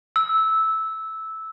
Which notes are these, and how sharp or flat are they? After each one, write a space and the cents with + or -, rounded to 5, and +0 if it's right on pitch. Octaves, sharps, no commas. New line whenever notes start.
E6 -10